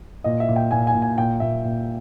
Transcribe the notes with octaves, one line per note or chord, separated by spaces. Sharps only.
A#2 D#5
E5
A#2
G5
A#2 G#5
G#5
A#2
G#5
A#2 G5
A#2 E5
A#2